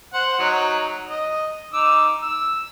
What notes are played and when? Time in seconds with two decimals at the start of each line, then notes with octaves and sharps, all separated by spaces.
0.14 C5 F#5
0.39 F#3 D#4
1.07 D#5
1.73 D#4 D6 E6
2.22 E6